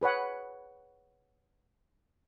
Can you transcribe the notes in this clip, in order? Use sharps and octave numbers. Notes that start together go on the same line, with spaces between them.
G#4 B4 C#5 F#5